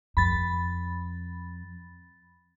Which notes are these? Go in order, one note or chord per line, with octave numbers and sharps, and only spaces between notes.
F2 B5 A6